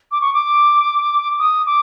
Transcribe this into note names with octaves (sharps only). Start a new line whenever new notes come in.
D6
C#6
D6
D#6
D6